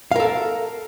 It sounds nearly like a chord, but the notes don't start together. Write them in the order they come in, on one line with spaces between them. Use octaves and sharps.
F5 A#4 A4